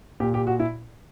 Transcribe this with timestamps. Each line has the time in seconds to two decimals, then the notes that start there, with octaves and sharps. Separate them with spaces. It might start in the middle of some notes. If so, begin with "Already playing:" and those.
0.20 A#2 G4
0.34 G4
0.47 F#4
0.60 E4